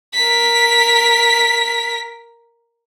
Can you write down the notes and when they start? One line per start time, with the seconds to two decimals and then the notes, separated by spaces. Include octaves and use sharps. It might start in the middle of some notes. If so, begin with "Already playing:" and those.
0.14 A#4 B6